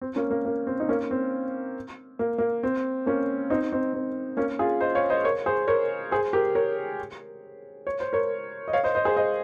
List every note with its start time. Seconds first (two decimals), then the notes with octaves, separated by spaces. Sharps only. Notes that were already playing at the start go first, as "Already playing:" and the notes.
0.01 C4
0.16 A#3 C#4
0.30 A#3
0.45 A#3
0.67 C4
0.80 D#4
0.89 A#3 C#4
1.11 C4
2.19 A#3
2.38 A#3
2.63 C4
3.06 A#3 C#4
3.50 C4 D#4
3.72 C4 D#4
3.94 C4
4.37 A#3 C#4
4.59 F4 G#4
4.81 C5 D#5
4.95 C#5 F5
5.10 C5 D#5
5.24 A#4 C#5
5.46 G#4 C5
5.68 A#4 C#5
6.11 G#4 C5
6.33 G4 A#4
6.55 A#4 C#5
7.87 C#5
8.00 C5
8.13 A#4 C#5
8.68 D#5
8.73 C#5 F5
8.84 C5 D#5
8.95 C5 D#5
9.05 G#4 C5
9.17 C5 D#5